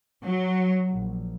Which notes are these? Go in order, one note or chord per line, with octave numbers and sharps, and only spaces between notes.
F#3
A#1